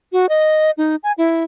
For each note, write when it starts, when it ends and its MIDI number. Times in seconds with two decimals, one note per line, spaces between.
0.12 0.29 66
0.29 0.71 75
0.78 0.96 63
1.03 1.12 80
1.18 1.44 64